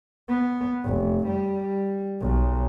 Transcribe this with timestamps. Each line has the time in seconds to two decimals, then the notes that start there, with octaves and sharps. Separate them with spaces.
0.29 B3
0.84 F1
1.27 G3
2.21 B1